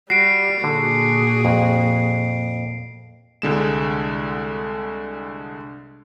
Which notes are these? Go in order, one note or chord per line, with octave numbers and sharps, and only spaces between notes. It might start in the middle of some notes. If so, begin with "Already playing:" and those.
G3 F#4 C7 D7
A#2 D3 F#4 G#4
F2
C2 D3 G#3 E7